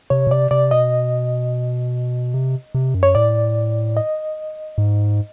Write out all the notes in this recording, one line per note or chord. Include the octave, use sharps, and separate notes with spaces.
C3 C#5
B2
C3 D5
C3 D5
B2 D#5
C3
C3
F#2
C#5
A2 D5
D#5
G#2